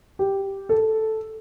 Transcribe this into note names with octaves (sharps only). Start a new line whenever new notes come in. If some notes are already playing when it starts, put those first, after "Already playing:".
G4
A4